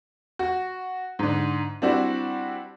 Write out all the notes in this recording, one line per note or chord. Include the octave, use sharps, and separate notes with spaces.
F#4
G#2 D3
G3 C4 D4 E4 F#4